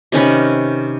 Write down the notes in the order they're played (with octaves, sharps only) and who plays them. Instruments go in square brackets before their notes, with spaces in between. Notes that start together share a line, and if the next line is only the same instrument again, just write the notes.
[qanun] C3 D#3 C#4 B4